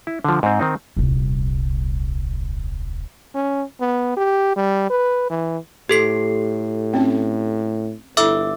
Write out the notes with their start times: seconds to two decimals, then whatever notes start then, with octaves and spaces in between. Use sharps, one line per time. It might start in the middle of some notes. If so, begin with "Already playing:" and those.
0.07 E4
0.24 D3 F3
0.43 G#2 C4
0.60 D#3 C4 D#4
0.97 D#1 C2
3.35 C#4
3.80 B3
4.17 G4
4.56 G3
4.90 B4
5.30 E3
5.89 A2 G4 A4 C7
6.94 C4 C#4
8.17 G1 E4 A4 E5 D6 E6